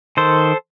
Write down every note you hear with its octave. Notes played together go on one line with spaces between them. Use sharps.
D#3 A4 C5